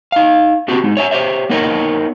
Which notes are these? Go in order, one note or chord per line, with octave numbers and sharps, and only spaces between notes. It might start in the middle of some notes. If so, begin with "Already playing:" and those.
D#4 F5
B3 C4 F#4 G4
G#3 D#4
C#5 E5 G#5
G4 C5 C#5 E5
A#3 B3 D#4 A#4 C#5 D#5